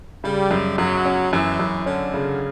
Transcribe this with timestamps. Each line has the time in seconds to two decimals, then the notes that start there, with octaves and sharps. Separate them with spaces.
0.24 C#3 G3
0.51 F#2
0.78 F#2 F#3
1.05 C#4
1.33 F#2 E3
1.59 F#2
1.86 D3 C#4
2.14 C#3